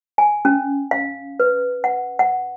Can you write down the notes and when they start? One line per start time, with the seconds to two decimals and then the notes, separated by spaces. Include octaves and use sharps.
0.18 G#5
0.45 C#4
0.91 F5
1.40 B4
1.84 F#5
2.19 F#5